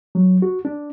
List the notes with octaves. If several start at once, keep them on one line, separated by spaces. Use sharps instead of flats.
F#3
F#4
D4